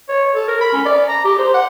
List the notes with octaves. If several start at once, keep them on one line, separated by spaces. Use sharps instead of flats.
C#5
A4
A#4
B5
C#4
D5
A#5
G4
C5
F#5